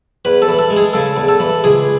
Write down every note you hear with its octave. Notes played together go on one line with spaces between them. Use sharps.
E2 B4
A4
E3
A4
G#3
G#4
C#3 A4
E2
A4
E3
C#2 G#4